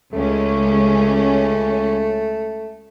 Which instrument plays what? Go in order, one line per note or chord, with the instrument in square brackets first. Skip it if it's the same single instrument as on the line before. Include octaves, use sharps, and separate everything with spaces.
[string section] C#2 C#4 [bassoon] A3